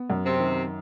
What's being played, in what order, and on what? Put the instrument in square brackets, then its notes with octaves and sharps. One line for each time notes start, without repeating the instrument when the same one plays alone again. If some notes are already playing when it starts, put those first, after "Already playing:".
Already playing: [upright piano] B3
F#2
[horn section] C3 C4
[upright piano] D#3